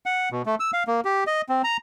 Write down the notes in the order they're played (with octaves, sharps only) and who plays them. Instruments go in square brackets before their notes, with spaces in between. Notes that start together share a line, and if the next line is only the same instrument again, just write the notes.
[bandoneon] F#5
B2
A3
E6
F5
A#3
G4
D#5
C4
A#5